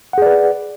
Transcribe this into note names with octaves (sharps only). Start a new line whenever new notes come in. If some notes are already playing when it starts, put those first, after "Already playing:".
G#4 B4 D5 F#5